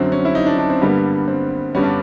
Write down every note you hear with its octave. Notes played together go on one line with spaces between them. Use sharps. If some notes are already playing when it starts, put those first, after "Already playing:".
Already playing: F#2 D3 F#3 C4
C#4
E4
D#4
D4
D4
C4
G2 D3 G3 A#3 B3
C4
G2 D3 G3 B3 C#4
D4